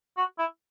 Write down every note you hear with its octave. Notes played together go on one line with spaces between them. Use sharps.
F#4
E4